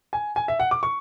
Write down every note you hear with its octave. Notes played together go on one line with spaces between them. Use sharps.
G#5
G#5
E5
F#5
D6
C#6